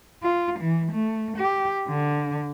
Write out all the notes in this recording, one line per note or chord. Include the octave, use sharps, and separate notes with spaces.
F4
E3
A3
G4
D3